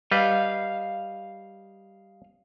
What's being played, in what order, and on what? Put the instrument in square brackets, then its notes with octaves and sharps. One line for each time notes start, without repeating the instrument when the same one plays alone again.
[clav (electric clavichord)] G3 B4 [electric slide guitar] D#5 F5